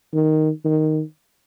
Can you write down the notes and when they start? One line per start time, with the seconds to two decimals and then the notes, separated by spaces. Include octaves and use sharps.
0.13 D#3
0.65 D#3